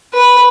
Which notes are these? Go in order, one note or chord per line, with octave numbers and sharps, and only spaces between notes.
B4